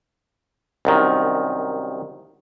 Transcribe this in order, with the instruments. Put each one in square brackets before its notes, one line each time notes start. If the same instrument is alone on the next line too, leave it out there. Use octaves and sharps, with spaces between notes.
[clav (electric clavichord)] C2 F#2 D#3